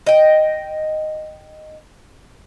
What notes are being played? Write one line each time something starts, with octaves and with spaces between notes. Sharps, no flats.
D#5 G5